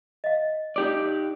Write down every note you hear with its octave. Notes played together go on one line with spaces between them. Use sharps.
D#5 F5
D#4 G4 D5